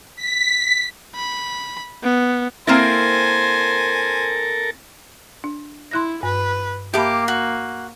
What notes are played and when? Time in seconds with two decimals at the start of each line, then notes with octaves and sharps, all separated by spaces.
0.16 B6
1.16 B5
2.03 B3
2.67 A#3 C4 E4 A4 A#4 C5 G#5
5.44 D4
5.91 E4 C6 F#6 A#6
6.23 G2 B4
6.94 A#3 G4 E5 A5 B5 D6
7.28 F#4